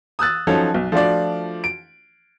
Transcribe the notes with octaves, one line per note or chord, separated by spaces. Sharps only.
D#6 E6 F#6 A6
F3 F#3 C#4 D#4 A4 C#5
B1
F3 A3 D4 F4 F#4 D5
D7